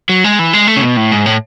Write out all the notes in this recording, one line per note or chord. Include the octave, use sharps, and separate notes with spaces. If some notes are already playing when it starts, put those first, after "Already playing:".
F#3
G#3
E3
G#3
A3
C#3
B2
A2
G#2
A2